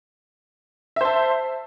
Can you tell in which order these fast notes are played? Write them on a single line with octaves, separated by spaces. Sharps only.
E5 C5 A5